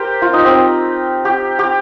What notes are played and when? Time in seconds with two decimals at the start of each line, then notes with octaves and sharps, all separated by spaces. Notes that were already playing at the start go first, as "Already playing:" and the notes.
Already playing: G4 A#4 C5
0.22 F4
0.33 D#4
0.45 C4
1.25 G4
1.59 G4